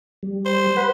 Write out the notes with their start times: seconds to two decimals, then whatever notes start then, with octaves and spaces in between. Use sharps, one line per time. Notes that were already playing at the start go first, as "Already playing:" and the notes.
0.23 G3
0.45 C5
0.77 B4 F#5 B5